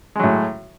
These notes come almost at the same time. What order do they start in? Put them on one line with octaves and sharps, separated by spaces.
G#3 F#3 A2